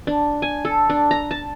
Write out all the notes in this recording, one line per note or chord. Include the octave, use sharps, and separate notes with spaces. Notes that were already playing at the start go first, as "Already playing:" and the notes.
D4
G#5
A4
D4
A#5
A5